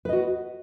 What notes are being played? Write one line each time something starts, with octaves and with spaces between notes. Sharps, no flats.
F#4 B4 D#5